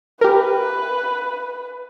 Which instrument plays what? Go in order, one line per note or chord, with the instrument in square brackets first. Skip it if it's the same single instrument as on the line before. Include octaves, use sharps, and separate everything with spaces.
[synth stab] G4 A#4 [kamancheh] B4